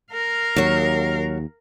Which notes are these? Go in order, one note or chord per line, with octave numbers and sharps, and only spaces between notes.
A#4 F5
D#2 F#3 C#5